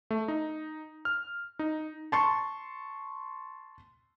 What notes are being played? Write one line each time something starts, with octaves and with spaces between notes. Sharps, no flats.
A3
D#4
F6
D#4
A5 C6 C#6